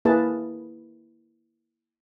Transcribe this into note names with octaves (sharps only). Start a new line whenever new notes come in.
A#3 E4 G#4 B4 A5